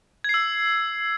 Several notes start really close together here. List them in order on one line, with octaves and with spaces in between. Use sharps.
G#6 C7 E6